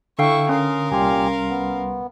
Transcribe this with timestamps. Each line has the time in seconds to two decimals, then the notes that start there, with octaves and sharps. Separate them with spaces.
0.19 D3 E4 A4 F5 G5 C#6
0.49 C#4 A#4 F5 C6 D#6
0.91 C2 A#2 G3 G4 G#5 C6
1.49 B3